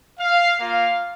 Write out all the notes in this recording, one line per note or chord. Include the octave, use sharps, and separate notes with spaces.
F5
A#3 F4 F5